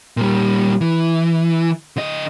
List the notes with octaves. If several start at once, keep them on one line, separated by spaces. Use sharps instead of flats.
A#2 G3
E3
D3 D#5